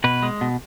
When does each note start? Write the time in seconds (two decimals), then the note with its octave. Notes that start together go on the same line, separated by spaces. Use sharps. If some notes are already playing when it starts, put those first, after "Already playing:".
0.04 B2 B4
0.23 G#3
0.41 B2